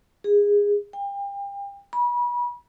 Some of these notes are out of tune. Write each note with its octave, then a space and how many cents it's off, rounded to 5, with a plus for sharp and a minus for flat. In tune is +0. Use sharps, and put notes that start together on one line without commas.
G#4 -20
G5 +35
B5 -35